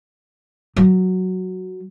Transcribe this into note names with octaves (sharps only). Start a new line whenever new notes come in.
F#3